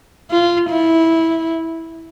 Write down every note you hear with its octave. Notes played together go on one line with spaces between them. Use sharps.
F4
E4